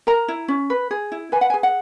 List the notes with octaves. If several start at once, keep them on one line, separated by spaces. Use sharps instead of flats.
A#4 A#5
E4
C#4
B4
G#4
E4
B4 G#5
F#5
G#5
G#4
F#5